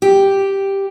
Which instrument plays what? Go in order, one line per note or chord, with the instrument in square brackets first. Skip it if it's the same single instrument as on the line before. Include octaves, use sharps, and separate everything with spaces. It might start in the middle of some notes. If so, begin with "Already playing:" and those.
[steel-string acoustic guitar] G4